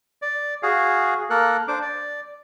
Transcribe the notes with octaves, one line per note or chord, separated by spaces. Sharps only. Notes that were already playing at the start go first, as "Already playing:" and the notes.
D5
F#4 G#4 F5
A#3 A4 A#4 F#6
D4 C5 D6
D5